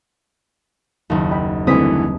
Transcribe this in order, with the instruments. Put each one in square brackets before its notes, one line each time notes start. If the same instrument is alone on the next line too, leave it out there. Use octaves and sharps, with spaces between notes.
[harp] F#1 D#2
[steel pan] D#5 G5 B5
[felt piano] D3 E3 A3 [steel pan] G3 C4 B4 [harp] D#6 B6